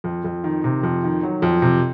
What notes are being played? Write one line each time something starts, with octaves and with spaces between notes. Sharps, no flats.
F2
F2
D#3
C3
F2
D#3
F#3
F2
C3